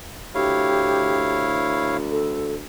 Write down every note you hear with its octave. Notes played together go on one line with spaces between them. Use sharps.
D2 E4 G4 C#5 F5
A4